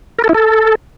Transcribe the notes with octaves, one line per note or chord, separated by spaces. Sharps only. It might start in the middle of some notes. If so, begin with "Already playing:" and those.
A#4
A4
E4
A4